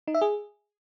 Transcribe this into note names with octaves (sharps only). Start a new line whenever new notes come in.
D#4
E5
G#4